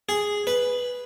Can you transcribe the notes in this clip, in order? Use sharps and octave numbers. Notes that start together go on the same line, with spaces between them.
G#4
B4